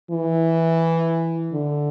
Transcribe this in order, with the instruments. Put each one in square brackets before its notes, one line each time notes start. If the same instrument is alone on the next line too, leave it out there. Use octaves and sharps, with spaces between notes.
[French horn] E3
D3